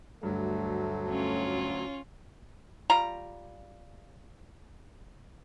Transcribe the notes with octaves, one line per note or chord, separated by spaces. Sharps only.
D2 G2 F#3 A3
C#4 F4
G3 F4 A#5